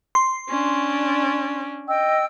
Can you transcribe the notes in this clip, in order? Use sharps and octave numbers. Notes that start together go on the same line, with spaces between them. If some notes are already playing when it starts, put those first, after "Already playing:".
C6
C#4 D4
D#5 G5 E6